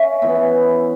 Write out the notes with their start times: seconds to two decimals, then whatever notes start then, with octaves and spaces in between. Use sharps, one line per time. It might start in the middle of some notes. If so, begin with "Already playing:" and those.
Already playing: C#4 E5
0.22 E3 B3 E4